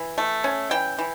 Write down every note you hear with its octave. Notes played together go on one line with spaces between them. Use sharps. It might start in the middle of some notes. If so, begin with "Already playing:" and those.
Already playing: E3
A3
C#4
E3 G5
E3